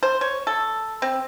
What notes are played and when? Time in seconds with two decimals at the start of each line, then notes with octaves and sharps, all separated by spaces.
0.03 C5
0.21 C#5
0.47 A4
1.02 C4